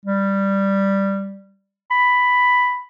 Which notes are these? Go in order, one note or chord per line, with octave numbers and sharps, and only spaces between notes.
G3
B5